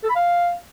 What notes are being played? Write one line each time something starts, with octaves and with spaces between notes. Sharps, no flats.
A4
B5
F5